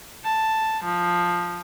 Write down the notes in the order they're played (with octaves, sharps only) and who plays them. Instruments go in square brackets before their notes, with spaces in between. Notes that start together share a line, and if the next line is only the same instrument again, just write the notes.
[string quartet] A5
F3